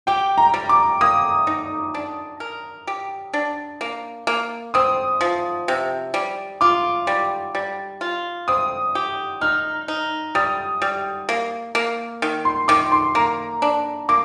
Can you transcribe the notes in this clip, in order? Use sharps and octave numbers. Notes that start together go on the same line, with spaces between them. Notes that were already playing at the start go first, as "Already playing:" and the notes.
G4 G5
A#5
G3
D6
A#3 D#6
D#4
D4
A#4
G4
D4
A#3
A#3
C4 D#6
F3
C3
G3
F4 D6
G3
G3
F4
C4 D#6
G4
D#4 F6
D#4
G3 D#6
G3
A#3
A#3
D#3
C6
D#3 D6
C6
A#3 A#5
D4
A#3 D6